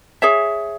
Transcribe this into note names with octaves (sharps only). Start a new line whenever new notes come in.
G#4 C#5 E5